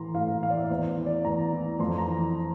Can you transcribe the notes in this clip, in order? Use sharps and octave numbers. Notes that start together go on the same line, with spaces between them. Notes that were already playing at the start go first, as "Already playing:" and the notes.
Already playing: A2 E3 A#5 C6
A2 F5
F5
E3 F5
D5
E5
D5
E2 C5
E3
D5
E2 A#5
E3
F2 C6
A#5
E3